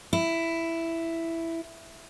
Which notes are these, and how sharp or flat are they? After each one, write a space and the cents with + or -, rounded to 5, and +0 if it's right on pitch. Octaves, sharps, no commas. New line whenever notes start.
E4 +5